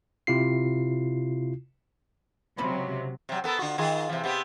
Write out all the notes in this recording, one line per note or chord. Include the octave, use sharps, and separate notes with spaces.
C3 E4 F4 C7
C#2 C3 F#3 C4 B5
C3 F#3
B3 A4 A#4
D3 F4 F#4
D#3 F4 G#4
C3 E3
C3 B3 G4